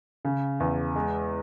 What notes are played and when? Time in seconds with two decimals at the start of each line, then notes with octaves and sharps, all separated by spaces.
0.25 C#3
0.60 E2
0.95 G#3